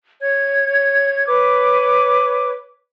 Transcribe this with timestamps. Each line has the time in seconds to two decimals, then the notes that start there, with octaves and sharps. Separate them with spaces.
0.21 C#5 G#6
1.27 B4 C#5 D6